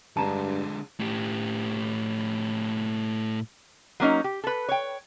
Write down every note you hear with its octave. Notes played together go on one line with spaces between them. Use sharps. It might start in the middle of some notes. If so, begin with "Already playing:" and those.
G2 D3 G#3 A5 A#5
A2 G4
F#3 A#3 C#4 D#4
G4
A4 B4
C#5 G5